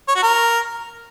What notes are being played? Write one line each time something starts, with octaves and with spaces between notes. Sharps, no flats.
C#5
F#4
A#4